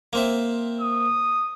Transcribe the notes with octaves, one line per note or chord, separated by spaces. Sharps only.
A#3 C4 E5
D#6